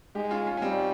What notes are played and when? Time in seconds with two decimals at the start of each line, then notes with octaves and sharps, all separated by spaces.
0.15 G#3 D#4 G4
0.31 C#4 F4
0.46 C#4 F4
0.57 C#4
0.62 G3 C4 D#4